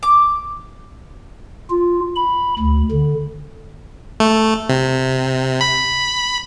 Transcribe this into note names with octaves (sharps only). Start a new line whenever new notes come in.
D6
F4
B5
D2
D3
A3
C3
B5